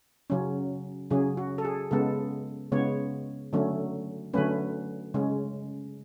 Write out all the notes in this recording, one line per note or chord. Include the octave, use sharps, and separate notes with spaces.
C#3 F#3 C#4
C#3 F#3 C#4 G#4
F#4
A4
G#4
C#3 G#3 B3 A4
C#3 G#3 B3 C#5
D3 F#3 A3 C#4
D3 F#3 A3 C#4 B4
C#3 G#3 C#4